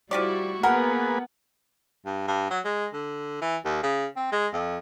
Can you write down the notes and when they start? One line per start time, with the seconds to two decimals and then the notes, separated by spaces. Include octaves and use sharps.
0.11 F3 G3 E4 F#4 G4 D5 C#6
0.63 A#3 B3 G#4 A#4 B4 F#5
2.06 G2
2.27 G2
2.51 F#3
2.65 G#3
2.93 D3
3.42 E3
3.65 D#2
3.83 C#3
4.16 C4
4.32 G#3
4.53 F2